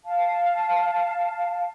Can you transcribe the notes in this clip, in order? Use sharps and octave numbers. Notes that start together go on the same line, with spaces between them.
F5 A5